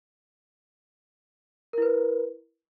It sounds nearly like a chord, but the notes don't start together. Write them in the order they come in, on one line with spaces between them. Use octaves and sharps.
A#4 E4 B4